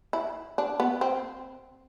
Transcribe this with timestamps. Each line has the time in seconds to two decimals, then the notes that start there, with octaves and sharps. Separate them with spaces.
0.13 E4
0.58 D4
0.80 B3
1.01 C4